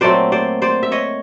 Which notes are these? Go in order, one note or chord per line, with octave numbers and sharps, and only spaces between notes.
A#2 F#3 A3 C4 C5 D5
C5 D5
C5 D5
E5
C#5 D#5